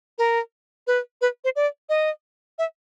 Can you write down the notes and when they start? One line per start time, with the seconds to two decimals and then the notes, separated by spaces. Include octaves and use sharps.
0.18 A#4
0.87 B4
1.21 B4
1.44 C5
1.56 D5
1.89 D#5
2.58 E5